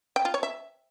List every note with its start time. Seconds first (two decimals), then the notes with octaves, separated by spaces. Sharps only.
0.16 G5
0.25 F4
0.34 C#5
0.43 E5